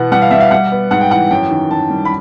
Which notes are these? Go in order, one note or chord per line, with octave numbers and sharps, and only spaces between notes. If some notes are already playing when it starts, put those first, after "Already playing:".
Already playing: B2 E3 B3 F#5
G3 F#5
F5
G3 E5
F5
G3 F#5
B3
G#2 F#5
G5
E3 F#5
F#2 G5
D#3
F#2 A5
G3
B5